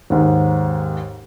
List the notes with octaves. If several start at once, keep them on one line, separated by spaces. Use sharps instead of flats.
D#2 G#2